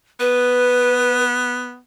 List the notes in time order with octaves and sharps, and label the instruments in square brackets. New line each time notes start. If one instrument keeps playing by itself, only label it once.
[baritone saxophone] B3 [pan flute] B4